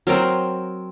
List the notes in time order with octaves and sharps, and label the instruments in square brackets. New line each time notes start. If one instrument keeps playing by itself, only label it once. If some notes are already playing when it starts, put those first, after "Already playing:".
[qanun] F#3 C4 A#4 A#5